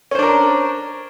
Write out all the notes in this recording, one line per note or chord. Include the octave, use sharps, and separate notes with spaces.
C#4 D4 A#4 C5